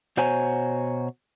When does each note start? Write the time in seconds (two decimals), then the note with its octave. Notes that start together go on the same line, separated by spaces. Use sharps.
0.17 B2 F#4 C5 C#5 G#5 A#5